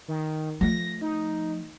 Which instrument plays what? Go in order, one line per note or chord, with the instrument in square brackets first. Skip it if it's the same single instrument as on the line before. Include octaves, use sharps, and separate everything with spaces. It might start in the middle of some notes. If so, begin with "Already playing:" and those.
[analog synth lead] D#3
[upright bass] F3 A3 [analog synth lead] A#6
[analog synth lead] D#4